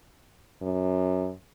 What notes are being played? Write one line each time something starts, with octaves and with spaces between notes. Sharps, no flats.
F#2